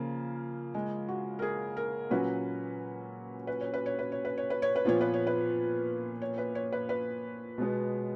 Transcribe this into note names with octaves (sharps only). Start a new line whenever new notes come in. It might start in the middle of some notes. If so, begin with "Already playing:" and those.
Already playing: C#3 F3 A#3 F4
G#3
F#4
A#4
G#4
A#4
A#2 F#3 C#4 F#4 B4
B4
C#5
B4
C#5
B4
C#5
B4
C#5
B4
C#5
B4
A#2 F3 B3 F4 C#5
B4
C#5
B4
C#5
B4
C#5
B4
B4
B2 G#3 B3